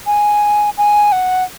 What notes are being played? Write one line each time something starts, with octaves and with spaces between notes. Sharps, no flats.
G#5
G#5
F#5